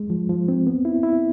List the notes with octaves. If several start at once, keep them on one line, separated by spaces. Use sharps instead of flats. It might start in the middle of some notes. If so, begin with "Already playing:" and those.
Already playing: G#3
F3
F3
C4
B3
E4
E4